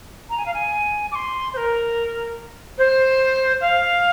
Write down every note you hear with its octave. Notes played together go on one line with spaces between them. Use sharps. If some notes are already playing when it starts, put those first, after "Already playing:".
A#5
G#5
F5
G#5
D6
C6
C5
A#4
C5
F5